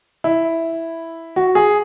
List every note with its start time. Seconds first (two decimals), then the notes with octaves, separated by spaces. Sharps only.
0.24 E4
1.36 F#4
1.55 G#4